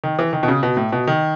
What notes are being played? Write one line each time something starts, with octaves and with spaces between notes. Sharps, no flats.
D#3
E3
D#3
B2
C#3
B2
A2
B2
D#3